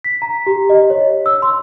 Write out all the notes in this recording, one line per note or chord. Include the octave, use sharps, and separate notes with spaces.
B6
A#5
G4
D#5
C#5
E6
C6